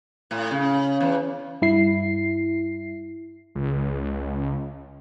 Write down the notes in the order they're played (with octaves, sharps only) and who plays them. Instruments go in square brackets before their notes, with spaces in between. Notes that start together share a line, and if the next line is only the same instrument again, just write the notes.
[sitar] A2
C#3
E2
[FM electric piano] G2 E4 C7
[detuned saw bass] C#2